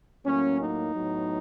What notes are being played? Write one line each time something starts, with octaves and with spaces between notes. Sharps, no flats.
A2 F#3 A#3 C#4
D#4
A2 F#3 B3